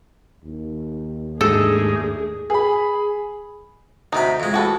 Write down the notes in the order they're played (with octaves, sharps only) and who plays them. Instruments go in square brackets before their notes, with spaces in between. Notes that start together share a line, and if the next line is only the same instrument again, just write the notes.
[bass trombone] D#2
[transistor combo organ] G#2 D#4 [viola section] A3 D4 G#4 [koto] A4
[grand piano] G#4 B5
[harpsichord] D2 C3 B5 [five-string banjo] D#4
[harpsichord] F2 G#3
[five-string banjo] F#4 A4 B4